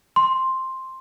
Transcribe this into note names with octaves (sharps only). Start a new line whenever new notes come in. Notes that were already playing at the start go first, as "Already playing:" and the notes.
C6